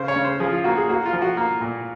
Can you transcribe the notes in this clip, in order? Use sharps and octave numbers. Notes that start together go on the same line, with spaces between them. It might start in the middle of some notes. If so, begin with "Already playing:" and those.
Already playing: C#3 C5
C#5
C#3
C5
F3 G#4
F4
A#3 F#4
G#4
A#3 F#4
F4
F3
F#4
A#3
A#2